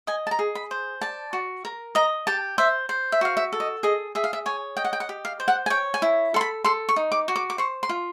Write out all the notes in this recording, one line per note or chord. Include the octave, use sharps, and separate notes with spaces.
D#5 G#5
A5
A#5
G#4
B5
C5
D5 A5
F#4
A#4
D#5 A#5
G4 A5
C5 E5
C5
E5
F#4 F5
E5
A4
D#5
G#4 D#5
G#4 E5
F5
E5
C#5 G#5
D#5 G5
F#5
G5
F#5
G4
F5
C5
F#5
G#5
C#5 G5
G#5
E4
A4 C6
B5
A4 C6
C#6
D#4
D6
F#4
D6
D6
C5 C#6
C6
F4